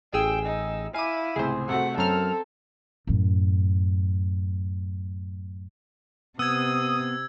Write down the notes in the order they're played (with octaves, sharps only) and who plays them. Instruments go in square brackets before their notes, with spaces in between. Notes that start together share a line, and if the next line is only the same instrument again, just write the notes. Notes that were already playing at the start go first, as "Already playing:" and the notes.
[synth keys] A1 G#4 E6 [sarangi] G5
[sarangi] D#4
[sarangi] E4 [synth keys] F5 D#7 [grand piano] G#5 D6
[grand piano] C#2 A2 C3 [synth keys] G#4 C5
[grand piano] C3 A3 F#4 [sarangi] F#5
[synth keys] F#2 F6 [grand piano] C4 A#5 [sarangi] A4
[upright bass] F#2 A2
[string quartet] C3 [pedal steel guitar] B3 [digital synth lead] D#6 [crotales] E6 G#6